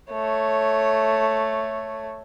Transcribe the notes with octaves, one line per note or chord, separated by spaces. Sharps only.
A3 C#5